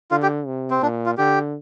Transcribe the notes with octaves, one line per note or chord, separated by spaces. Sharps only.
D3 F4
G4
C3
C4
A#2 D4
F4
D3 G4